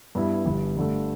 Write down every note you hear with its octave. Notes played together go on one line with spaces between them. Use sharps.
G2 G3 B3 E4
G1 G2 G3
G2 D3 A3